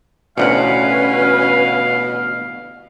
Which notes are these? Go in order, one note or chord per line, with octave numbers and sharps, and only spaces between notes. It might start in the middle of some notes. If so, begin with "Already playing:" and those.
A1 D2 B2 C#4 B4 F5 F#5